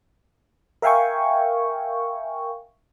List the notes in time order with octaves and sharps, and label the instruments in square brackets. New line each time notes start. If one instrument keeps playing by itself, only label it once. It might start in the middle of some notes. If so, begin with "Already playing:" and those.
[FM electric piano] A#4 E5 F5 G5 G#5 C#6